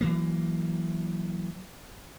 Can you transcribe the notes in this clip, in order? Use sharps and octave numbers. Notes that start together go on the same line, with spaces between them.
E3 F#3 A#3